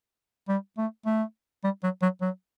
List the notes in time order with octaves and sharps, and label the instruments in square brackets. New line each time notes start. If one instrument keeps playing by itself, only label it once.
[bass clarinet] G3
A3
A3
G3
F#3
F#3
F#3